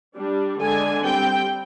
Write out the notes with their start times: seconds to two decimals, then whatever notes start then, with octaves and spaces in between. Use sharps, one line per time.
0.16 G3 D4
0.60 D3 G#3 D4 G#5
1.05 G3 C4 G5